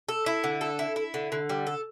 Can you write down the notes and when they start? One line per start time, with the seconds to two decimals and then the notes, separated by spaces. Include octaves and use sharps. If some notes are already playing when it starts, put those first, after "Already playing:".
0.09 A4
0.26 E4
0.44 D3
0.61 A4
0.79 E4
0.96 E4
1.14 D3
1.32 D3
1.49 G3
1.67 A4